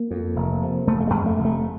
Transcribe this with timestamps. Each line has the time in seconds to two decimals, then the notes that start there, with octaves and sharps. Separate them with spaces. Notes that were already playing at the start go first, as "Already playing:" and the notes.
Already playing: A#3
0.11 F2
0.36 F1
0.62 C3
0.87 F1 A3
1.00 A3
1.07 G#3
1.14 F2
1.26 A3
1.38 F1
1.45 A3